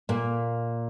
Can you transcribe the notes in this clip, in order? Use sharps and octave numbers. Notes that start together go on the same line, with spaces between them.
A#2 A#3